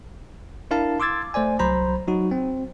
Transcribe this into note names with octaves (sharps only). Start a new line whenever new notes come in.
D4 E4 A#4 F5 A5
C6 D6 E6 G#6 A6
A3 C5 D5 G#5
C2 F#3 C5 A#5 B5
F#3 D#4 F#4
C4